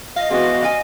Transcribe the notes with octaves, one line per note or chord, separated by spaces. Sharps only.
D#5 F5
E3 G#3 B3 C4 F#4 G#4 D#5
D5 F5 G#5